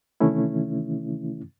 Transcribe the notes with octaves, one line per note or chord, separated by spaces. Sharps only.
C3 D#3 E3 A3 C#4 E4